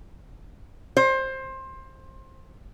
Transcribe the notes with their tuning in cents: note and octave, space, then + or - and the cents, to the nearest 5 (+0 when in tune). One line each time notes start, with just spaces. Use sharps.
C5 +20